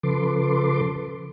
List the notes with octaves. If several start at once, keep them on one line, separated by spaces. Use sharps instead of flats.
C#3 F3 A4 B4 C6 D6